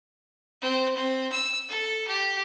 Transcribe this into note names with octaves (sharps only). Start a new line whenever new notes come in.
C4
C4
E6
A4
G4